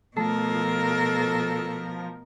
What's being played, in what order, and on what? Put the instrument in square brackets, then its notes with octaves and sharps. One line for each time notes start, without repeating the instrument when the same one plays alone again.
[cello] B2 A#4 [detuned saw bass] F3 [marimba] A3 [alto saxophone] A4